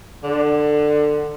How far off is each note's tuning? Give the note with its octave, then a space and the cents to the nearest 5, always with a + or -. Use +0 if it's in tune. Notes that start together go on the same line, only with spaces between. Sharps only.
D3 +20